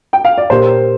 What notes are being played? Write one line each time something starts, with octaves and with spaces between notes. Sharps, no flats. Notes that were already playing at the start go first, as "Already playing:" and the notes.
G5
F5
D5
A#2 A#3 G4 A#4 C5